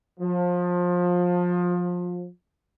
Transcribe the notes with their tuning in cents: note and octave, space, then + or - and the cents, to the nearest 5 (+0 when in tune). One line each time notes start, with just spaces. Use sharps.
F3 +25